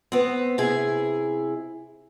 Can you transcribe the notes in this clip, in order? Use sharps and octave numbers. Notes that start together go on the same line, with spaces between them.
B3 C4
C3 E4 G#4